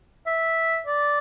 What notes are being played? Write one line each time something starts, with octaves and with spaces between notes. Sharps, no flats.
E5
D5